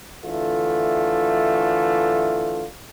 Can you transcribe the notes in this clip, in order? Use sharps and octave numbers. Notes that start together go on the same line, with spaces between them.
D3 E3 A3 F4